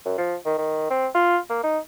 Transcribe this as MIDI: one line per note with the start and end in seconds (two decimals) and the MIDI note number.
0.05 0.13 42
0.18 0.35 53
0.45 0.54 51
0.58 0.85 51
0.90 1.07 60
1.14 1.38 65
1.50 1.59 58
1.63 1.79 63